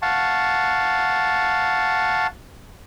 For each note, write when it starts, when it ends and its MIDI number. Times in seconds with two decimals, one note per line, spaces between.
0.02 2.27 77
0.02 2.27 78
0.02 2.27 81
0.02 2.27 85